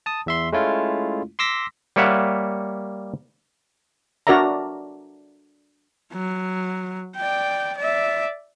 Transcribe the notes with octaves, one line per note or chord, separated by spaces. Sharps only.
A5 D#6
E2 E5 C6
G#3 A3 C#4 E4 F4
C6 D6 E6 A#6 B6
G3 A#3 C#5 E5 F#5
D4 F#4 A#4 D5 E5 A#5
F#3
D5 G5
D5 E5